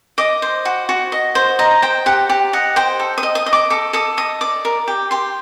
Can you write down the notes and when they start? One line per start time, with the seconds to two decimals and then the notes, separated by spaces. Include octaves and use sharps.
0.18 D#5 D6
0.42 C5
0.65 F#4
0.89 F#4
1.12 D#5
1.35 C5
1.59 D#5 A#5
1.82 C5 G5
2.06 G4 F#5
2.29 G4
2.53 D#5 F#5
2.76 C5 G5
3.00 A4
3.18 D#6
3.23 D#5
3.35 D#6
3.46 D#5
3.53 D6
3.70 A4 D6
3.93 A4 D#6
4.17 D#5 D#6
4.41 D5 D6
4.65 A#4
4.88 G4
5.11 G4 C6